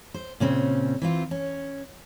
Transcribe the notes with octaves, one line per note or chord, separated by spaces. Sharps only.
C5
A#2 C#3 C4 C#4
E3 C4 F4
C#4